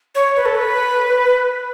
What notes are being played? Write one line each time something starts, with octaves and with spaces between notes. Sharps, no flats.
C#5
B4
A4
B4